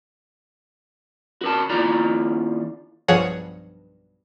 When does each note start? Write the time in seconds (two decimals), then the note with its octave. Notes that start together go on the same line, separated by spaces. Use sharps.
1.41 F#4 A#4 A5
1.70 D#2 E4 F4 D5 A#5
3.08 B1 G2 F3 G#4 C#5 F#5